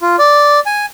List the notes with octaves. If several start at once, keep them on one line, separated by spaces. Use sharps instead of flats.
F4
D5
G#5